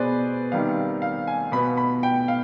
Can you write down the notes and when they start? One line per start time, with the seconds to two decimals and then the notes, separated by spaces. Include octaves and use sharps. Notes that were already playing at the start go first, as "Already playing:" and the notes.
Already playing: B2 B3 G#4 B4 C5 D5
0.51 C3 D#3 G3 B3 F5
1.02 F5
1.27 G#5
1.52 B2 B3 B5
1.77 B5
2.03 G5
2.28 F5